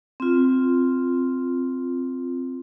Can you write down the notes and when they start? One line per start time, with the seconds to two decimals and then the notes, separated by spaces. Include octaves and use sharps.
0.20 C4 F4